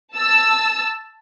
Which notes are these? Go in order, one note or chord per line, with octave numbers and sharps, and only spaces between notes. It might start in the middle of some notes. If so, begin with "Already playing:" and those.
A5 E6